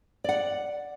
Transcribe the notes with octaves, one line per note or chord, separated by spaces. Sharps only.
D5 F#5